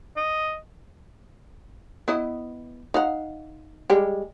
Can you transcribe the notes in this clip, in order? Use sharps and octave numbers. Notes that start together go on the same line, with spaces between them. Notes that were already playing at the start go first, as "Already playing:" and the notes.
D#5
B3 E4 D#5
D#4 F5 F#5
G3 G#3 G4